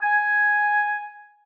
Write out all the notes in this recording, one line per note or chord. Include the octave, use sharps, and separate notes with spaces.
G#5